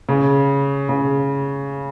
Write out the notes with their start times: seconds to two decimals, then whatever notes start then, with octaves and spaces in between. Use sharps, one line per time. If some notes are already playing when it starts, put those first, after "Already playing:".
0.09 C#3
0.89 C#3